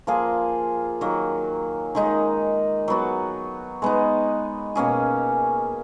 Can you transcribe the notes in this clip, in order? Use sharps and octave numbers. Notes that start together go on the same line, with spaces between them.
F3 A#3 F4 G#4
D#3 F#3 A#3
D#3 G#3 D#4
F#3 B3 F#4
G#3 B3 D#4
B2 A#3 C#4 G#4